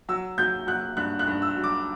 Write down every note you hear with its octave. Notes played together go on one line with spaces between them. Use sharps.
F#3 E6
F#3 G6
F#3 F#6
G2 F#6
F#6
G2
E6
F#3
D6